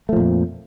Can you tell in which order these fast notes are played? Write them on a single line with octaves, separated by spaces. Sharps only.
A3 F3 A#2 F2